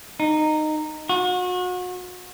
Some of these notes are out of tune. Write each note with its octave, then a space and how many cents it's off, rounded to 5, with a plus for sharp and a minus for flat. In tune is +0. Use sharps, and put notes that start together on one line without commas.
D#4 -15
F#4 -35